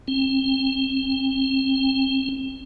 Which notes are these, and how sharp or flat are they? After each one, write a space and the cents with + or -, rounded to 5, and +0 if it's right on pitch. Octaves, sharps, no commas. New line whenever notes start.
C4 +35